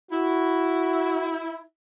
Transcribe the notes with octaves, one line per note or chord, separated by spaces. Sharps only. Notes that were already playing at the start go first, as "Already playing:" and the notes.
E4 F#4